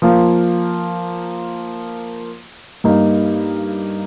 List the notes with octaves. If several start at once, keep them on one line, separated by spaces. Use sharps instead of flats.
F3 A#3 F4
G2 G3 A#3 D#4